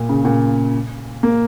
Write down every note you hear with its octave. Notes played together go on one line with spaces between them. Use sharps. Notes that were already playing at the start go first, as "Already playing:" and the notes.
Already playing: A#2
C#3
A#2
A#3